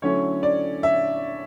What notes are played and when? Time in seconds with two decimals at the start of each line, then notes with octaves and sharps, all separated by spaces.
0.02 D3 F#3 A3 C#4 E4 C#5
0.43 D5
0.83 E5